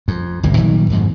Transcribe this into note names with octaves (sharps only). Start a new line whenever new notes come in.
F2
G1 C2 A2
A#2 D#3 F#3 G3
F2 G#2 B2